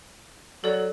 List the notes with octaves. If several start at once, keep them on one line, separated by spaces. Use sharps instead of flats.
F#3 A4 D5